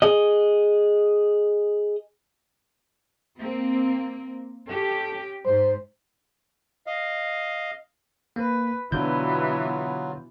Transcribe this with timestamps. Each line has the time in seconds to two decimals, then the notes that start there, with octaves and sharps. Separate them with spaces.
0.02 G#4 D#5
3.37 A#3 C4
4.68 C#4 G4 A4
5.45 G#2 C5
6.87 D#5 F5
8.36 A#3 B4
8.92 B2 D3 E3 F#3 B3 D4 F4 G6